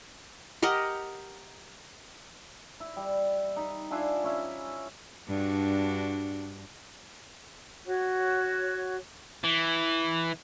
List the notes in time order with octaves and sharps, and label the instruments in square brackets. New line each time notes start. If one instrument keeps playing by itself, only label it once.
[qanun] G4 A#4 D#5 F#5
[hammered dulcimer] E4
G3
D#4 B5
D4 E4 F4 G#4
C#4 E4
[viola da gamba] G2 D4 F#4
[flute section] F#4 C#5
[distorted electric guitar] E3